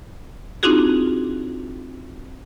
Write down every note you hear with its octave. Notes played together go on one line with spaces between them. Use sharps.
C4 D4 D#4 F4 F#4 G#4